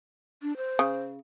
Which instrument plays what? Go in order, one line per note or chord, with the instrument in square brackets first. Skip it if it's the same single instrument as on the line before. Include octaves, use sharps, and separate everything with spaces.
[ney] D4
C5
[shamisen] C#3